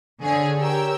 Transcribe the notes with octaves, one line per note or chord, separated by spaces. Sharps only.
D3 G#4 C#5
G4 A#4 C#5 G5 E6